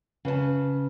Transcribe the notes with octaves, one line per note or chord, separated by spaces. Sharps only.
C#3 B4 C#5 A5